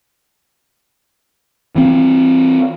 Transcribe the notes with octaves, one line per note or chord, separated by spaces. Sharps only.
E3 C4